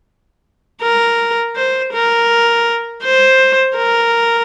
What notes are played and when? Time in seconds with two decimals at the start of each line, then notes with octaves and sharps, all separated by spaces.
0.82 A#4
1.56 C5
1.93 A#4
3.04 C5
3.77 A#4